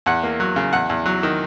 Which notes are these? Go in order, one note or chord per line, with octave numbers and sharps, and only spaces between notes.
E2 F#5
A#3
F#3
C#3
E2 F#5
E2
F#3
D#3